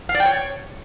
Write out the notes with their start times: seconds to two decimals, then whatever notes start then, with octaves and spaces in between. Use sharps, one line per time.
0.09 F5
0.15 D5
0.20 G5
0.25 C#5